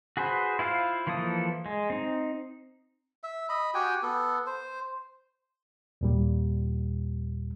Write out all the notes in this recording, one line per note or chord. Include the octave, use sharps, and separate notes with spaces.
F#4 G#4 B4 C5
E4 F4 C5 F5
E3 F3 A#3 A4 D#6
G#3
C4 D#4
E5
D#5 B5
F#4 G4 G5 G#5
B3 A4
C5
D#2 A#2 G3